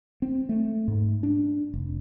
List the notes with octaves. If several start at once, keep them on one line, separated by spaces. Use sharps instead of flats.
C4
A3
G#2
D4
F1